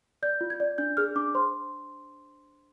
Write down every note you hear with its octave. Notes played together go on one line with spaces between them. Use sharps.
D5 G6
F4
G#6
D5
D4 G6
G#4 F6
D4 D6
C5 C6